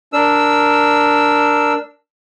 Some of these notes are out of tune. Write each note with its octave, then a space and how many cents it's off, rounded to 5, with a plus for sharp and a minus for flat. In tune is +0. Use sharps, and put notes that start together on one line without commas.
D4 +0 A#4 +0 E6 +0